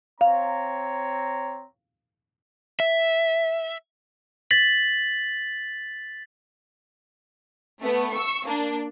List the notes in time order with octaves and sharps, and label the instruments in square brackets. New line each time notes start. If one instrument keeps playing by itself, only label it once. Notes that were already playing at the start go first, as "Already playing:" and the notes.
[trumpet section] C4 C#5 A#5 [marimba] F5
[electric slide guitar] E5
[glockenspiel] A6 B6 F#7
[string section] A3 B3
C#6 E6
A#3 D4